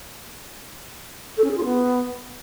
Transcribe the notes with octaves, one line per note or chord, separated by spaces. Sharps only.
A4
C#4
G#4
F4
B3